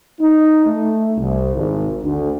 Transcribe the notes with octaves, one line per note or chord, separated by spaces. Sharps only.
D#4
A3
C2
G#1
D2